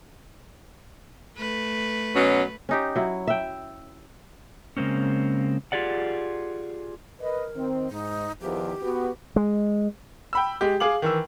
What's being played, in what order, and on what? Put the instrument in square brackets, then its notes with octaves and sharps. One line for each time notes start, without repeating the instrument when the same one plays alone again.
[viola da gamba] A3 B4
[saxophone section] B2 F#3 C#4
[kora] C#4 D#4 G4
F#3 E4
E5 G5
[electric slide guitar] C#3 G#3 A#3 C4 C#4
F4 G4 G#4 D5 F#5
[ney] A#4 [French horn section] B4 D#5
[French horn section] D#3 C4
[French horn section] G#2 [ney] D#4
[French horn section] E2 D#3 F3 [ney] G4
[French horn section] B3 F#4
[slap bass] G#3
[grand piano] G5 B5 E6
G#3 G4
G#4 F5 D6 F#7
D#3 E3 E6